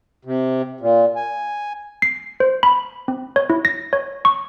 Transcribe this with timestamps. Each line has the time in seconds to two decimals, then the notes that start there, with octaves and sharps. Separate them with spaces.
0.25 C3
0.80 A#2
1.16 G#5
2.02 C7
2.40 C5
2.63 B5
3.08 C4
3.36 C#5
3.50 E4
3.65 A#6
3.93 C#5
4.25 C#6